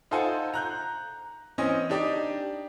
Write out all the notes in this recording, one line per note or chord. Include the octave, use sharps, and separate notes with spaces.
D#4 F4 A4 C5 F#5 G#5
A#5 F#6 G6
E3 C4 C#4 D#5
D4 D#4 G4 D5 D#5